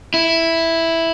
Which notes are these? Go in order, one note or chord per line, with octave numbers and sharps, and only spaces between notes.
E4